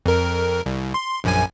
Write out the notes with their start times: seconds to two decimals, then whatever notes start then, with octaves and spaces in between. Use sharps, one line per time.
0.06 F2 A#4
0.66 C2
0.94 C6
1.24 A#1 F#2 G#5